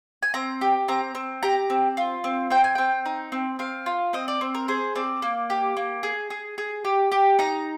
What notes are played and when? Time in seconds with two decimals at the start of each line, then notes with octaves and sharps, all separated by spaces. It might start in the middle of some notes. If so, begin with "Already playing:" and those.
0.23 G#5
0.34 C4 A#5
0.61 G4
0.88 C4 A#5
1.15 C4
1.43 G4 A#5
1.70 C4
1.97 F4
2.24 C4
2.50 C4 G5
2.64 G#5
2.75 C4 G5
3.06 D#4
3.32 C4
3.59 C4 F5
3.86 F4
4.13 C4 D#5
4.28 D5
4.41 C4
4.55 A#4
4.68 G#4 C5
4.95 C4 D5
5.22 A#3
5.50 G4
5.77 A#3
6.03 G#4
6.30 G#4
6.58 G#4
6.85 G4
7.12 G4
7.39 D#4 A#5